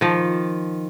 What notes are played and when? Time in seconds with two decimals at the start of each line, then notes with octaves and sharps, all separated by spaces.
0.01 D#3 F3